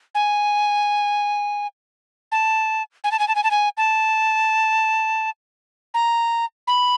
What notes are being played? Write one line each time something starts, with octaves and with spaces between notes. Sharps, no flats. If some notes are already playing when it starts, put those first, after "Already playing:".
G#5
A5
G#5
A5
G#5
A5
G#5
A5
G#5
A5
A#5
B5